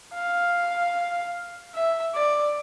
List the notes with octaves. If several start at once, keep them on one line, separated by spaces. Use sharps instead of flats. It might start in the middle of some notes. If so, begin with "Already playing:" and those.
F5
E5
D5